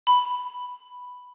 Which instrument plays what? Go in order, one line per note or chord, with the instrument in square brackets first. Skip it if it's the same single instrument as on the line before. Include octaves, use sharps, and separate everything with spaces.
[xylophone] B5